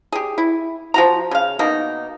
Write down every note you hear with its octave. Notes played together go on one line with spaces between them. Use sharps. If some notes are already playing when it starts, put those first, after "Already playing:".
G4 G#4
E4
F3 F#4 A#5
C#3 F5
B2 A#3 D#4